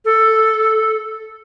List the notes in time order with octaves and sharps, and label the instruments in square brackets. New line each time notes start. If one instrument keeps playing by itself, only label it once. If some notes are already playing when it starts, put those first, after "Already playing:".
[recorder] A4